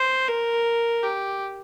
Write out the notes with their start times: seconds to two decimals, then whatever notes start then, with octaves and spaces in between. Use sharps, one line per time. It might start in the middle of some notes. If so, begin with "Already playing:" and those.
Already playing: C5
0.28 A#4
1.03 G4